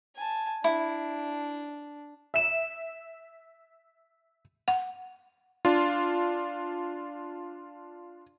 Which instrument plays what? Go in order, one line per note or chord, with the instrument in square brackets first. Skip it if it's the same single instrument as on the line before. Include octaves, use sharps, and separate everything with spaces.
[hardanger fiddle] G#5 A5
[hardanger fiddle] D4 [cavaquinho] E4
[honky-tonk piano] E5 E7
[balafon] F#5
[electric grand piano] D4 F4